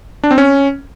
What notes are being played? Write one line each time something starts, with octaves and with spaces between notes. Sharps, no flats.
D4
C4
C#4